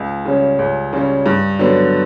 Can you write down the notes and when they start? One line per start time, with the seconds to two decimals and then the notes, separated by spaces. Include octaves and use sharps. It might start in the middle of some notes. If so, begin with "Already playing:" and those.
Already playing: C#2
0.26 C#3 G3 C#4
0.59 C#2
0.93 C#3 G3 C#4
1.26 G2
1.59 D3 F#3 B3